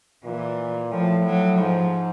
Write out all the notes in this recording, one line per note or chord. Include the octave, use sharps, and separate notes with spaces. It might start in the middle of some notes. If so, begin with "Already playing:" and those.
A#2 E3
A2 F3
F#3
G#2 F3